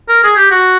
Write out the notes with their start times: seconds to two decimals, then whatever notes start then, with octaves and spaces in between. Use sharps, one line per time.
0.09 A#4
0.24 G#4
0.36 G4
0.51 F#4